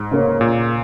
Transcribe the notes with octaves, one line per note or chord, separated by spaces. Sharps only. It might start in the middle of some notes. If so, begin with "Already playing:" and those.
Already playing: G#2
C#3 A#3 C#4
A#2